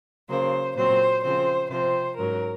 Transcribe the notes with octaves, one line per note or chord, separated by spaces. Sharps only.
C#3 F#3 A#3 C5
A#2 F#3 C4 C5
C#3 F3 C4 C5
C3 F3 C4 C5
G#2 F#3 C#4 A#4